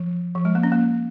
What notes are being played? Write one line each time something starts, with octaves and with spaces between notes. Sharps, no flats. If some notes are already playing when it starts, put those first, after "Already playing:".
Already playing: F3
F3
G#3
A#3
C#4
A#3